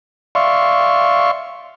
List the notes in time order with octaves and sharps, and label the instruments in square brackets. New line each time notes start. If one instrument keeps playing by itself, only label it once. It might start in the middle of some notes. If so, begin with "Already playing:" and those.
[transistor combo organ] D5 E5 F5 C6 C#6